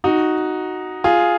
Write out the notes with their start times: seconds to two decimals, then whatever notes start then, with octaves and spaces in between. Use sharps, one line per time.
0.04 D#4 F#4
1.04 F4 G#4